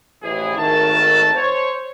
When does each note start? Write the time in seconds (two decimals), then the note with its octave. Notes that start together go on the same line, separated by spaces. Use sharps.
0.23 A1 F2 E3 G#4
0.58 G#1 D#3 A3 F#4 A#4 A5
1.35 C5 C#5